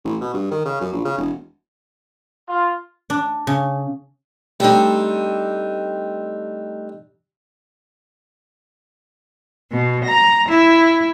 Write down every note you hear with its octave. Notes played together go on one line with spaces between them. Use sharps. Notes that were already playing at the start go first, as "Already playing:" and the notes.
A1
B2
G2
D#3
C#3
F#2
A#1
C#3
E1
F4
D4
C#3
G3 A3 C4 D4 D#4
B2
A#5
E4